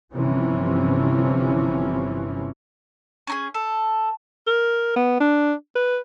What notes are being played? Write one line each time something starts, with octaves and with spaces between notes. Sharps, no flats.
G1 C3 E3 F3 C#4
C#4 D#4 G#4
A4
A#4
B3
D4
B4